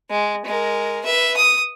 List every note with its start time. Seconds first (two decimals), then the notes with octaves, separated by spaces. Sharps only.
0.10 G#3
0.45 G#3 A#4
1.05 B4 E5
1.37 D#6